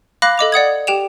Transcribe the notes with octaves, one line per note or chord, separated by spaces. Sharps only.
F5 B5 D6 F#6 A#6
A4 D#5 D6 F7
D5 F#5 D#6 G#6
G4 G5 E7 F7